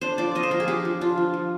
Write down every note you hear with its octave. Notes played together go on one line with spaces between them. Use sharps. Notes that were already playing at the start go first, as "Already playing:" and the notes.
D4 C5
F3 D5
F3 D#5
C5
F3 A#4
G#4
D4 G4
F3
D4 F4
F3
F3